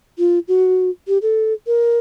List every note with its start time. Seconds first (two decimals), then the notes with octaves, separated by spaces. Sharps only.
0.18 F4
0.48 F#4
1.08 G4
1.22 A4
1.67 A#4